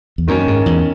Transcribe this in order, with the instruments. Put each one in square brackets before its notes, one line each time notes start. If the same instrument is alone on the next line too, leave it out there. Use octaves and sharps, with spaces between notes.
[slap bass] E2
[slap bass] F#2 [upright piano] D#3 A#3 C#4
[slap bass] G#2
E2